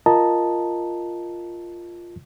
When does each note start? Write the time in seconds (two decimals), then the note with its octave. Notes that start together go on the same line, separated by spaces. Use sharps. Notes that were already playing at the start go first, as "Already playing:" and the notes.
0.06 F4 A#4 D#5 A5 A#5